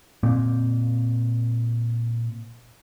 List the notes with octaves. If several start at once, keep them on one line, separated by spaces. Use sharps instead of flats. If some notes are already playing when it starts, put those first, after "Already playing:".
A#2 A#3 C4